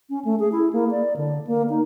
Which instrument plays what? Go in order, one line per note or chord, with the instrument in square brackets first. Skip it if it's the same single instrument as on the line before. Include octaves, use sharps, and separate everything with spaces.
[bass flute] C#4
A3
G#4
E4
A#3
D5
D3
A#3
D#4